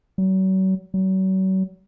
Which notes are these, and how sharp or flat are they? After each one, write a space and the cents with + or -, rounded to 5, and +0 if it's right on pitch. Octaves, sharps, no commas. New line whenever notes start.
F#3 +40
F#3 +40